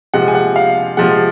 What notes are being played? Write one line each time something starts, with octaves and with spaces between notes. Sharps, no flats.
C3 F3 G#3 F#5
G#5
F#5
F5
C3 F3 G#3 F#5